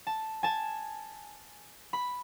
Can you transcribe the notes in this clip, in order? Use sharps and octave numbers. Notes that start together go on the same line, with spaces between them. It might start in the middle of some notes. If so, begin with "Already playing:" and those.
A5
G#5 A5
B5